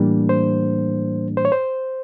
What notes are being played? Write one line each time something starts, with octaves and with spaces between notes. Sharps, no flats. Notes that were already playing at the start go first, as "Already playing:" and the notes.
Already playing: A2 E3 G3 A#3 D4
C5
C5
C#5
C5